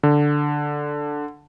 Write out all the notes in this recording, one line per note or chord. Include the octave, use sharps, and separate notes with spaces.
D3